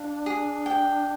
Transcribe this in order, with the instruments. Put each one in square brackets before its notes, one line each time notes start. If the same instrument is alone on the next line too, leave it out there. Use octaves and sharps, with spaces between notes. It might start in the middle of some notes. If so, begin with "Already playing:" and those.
Already playing: [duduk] D4 [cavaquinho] F5
[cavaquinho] G#4
G5